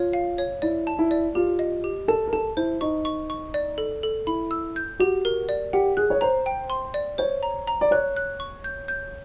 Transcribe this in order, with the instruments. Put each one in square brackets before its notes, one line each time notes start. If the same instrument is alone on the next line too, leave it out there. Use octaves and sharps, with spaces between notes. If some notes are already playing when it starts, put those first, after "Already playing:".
Already playing: [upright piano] F4 [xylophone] C#5
[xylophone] F5
C#5
[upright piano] E4 [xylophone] D5
[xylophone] A5
[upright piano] E4
[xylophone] D5
[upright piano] F4 [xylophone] G4
[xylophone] D#5
G4
[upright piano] A4 [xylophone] A5
[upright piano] A#4
[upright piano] A4 [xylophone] A5
[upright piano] E4 [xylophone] C5
[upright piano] D#4 [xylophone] C#6
[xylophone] C#6
C#6
D5
A4
A4
[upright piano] E4 [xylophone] B5
[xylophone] E6
G6
[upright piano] F#4 [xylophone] G4
[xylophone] A#4
D5
[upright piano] G4 [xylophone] F#5
[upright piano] G#4 [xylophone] F#6
[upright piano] C#5
[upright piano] C5 [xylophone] A#5
[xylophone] G5
C6
D5
[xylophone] C5 [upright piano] C#5
[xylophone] A#5
A#5
[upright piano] D5
[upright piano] C#5 [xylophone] F#6
[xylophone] F#6
C#6
G6
G6